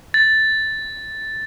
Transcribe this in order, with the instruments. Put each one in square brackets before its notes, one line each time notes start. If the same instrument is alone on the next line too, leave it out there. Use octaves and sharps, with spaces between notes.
[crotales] A6